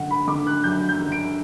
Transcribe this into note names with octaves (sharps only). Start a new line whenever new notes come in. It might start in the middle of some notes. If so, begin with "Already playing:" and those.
Already playing: F#2 D3 F#5
B5
D3 D6
F#6
F#2 G6
G6
D3
D7